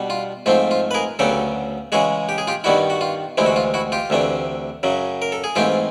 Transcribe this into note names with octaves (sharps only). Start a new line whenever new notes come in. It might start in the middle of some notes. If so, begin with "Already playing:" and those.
Already playing: B2 G3 B3 D4
F4
G#2 F3 A3 C4 F4
F4
B4
G#4 A#4
D2 C#3 F#3 B3 G4 A4
C#3 E3 G#3 F#4 G#4
G4
G#4
F4 G4
G2 D#3 G3 B3 E4 F#4
F#4
F4
D2 C3 E3 G#3 C4 E4
F#4
F4
E4 F#4
F4 G4
D2 C3 E3 A3 D4
F#2 C#3 F#3
A#4
A4
G#4
G#2 E3 A3 C4 F4 G4